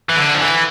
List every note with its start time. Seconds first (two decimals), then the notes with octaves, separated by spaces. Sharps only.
0.09 E3
0.17 D3
0.34 F3
0.40 E3